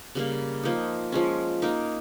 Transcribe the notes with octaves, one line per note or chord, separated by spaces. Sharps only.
C#3 G3 A#3
F3 A#3 D#4
F3 G#3 C#4
A#3 D#4 A#4